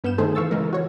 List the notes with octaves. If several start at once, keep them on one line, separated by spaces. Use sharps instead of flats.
G2 B3 F6 G6 E7
D#3 A3 D#4 G#4 A4 C5
E3 F5 C#6 E6 A6
C#3 E3 G#3 A#4
F#4 C#5